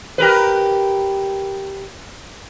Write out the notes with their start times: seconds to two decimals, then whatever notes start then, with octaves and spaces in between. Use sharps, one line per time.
0.18 G4 A#4 B4